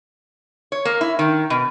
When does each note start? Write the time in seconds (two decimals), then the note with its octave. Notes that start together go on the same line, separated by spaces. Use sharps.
0.72 C#5
0.85 A#3
1.01 E4
1.19 D#3
1.50 B2